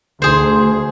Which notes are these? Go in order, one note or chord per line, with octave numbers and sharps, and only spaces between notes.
D2 G#4 C5